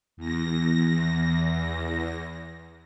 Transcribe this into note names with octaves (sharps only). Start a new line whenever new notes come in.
E2 A#6